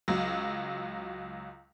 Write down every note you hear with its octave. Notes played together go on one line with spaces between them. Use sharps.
C#2 F#3